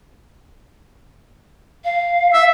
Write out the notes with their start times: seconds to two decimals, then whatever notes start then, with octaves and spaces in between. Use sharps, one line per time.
1.84 F5
2.33 E5